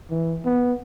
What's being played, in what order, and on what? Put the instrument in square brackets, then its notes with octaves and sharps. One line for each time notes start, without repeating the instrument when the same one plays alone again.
[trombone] E3
B3